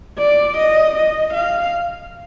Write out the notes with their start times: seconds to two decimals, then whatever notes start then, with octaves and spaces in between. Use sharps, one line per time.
0.19 D5
0.57 D#5
0.95 D#5
1.34 F5